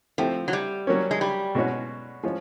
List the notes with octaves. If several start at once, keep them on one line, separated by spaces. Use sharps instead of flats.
F3 A3 C4 E4 G4
F#3
G3
F#3 A#3 C#4
G#3
G3
B2 G#3 C#4 F#4
F3 G#3 C#4 F4